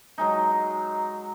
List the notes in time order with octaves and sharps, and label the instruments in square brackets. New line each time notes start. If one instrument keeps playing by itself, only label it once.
[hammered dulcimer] F#3 G#3 D#4